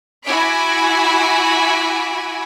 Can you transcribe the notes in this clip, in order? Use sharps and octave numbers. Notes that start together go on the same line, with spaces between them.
E4 F#4 G#5 D6 B6 D7